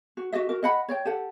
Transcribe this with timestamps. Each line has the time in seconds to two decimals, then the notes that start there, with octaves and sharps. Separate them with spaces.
0.17 F#4
0.32 F#4 G4 D#5 E5
0.49 F#4 A#4
0.63 D#5 F#5 B5
0.89 C#5 D5 G5
1.05 G4 A4 F#5